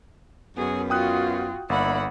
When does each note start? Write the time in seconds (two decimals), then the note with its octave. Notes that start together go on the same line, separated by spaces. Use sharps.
0.57 F#2 B3 F#4 G#4
0.90 F4 F#4 G5 D#6 F#6
1.70 G1 A#3 E4 D5 F#5 B5